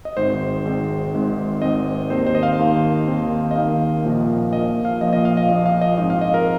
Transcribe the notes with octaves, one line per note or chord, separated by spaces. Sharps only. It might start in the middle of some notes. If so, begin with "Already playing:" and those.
D#5
G#1 G#2 G#3 C4 C5
G#1 G#2 G#3 C4
G#1 G#2 G#3 C4
G#1 G#2 G#3 C4 D#5
D#2 D#3 C4 C5
C5
D#5
F5
D#2 D#3 C4
D#2 D#3 C4
D#5
D#2 D#3 C4 F5
A#1 A#2 F3
A#1 A#2 F3 D#5
F5
A#1 A#2 F3 D#5
D#5
F5
D#5
A#1 A#2 F3 D#5
F5
D#5
G#2 F3 C4 D#5
F5
D#5
A#4